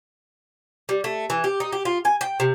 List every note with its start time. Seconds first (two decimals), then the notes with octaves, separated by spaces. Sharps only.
0.89 G3
1.04 A3
1.30 E3
1.44 G4
1.60 D#4
1.72 G4
1.85 F4
2.05 G#5
2.21 G5
2.40 C3